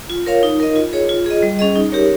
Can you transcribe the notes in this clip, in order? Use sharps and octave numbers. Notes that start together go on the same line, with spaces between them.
F4
A#4 C#5 F5
D#4
A#4 D#5
F4
G#4 C#5
F4
G#4 D#5
G3
C#4 G#4 D#5
D#4
G4 A#4 C#5